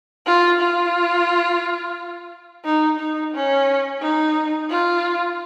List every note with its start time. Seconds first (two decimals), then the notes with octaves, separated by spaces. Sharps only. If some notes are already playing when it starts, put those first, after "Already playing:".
0.26 F4
0.60 F4
2.65 D#4
2.99 D#4
3.34 C#4
4.02 D#4
4.70 F4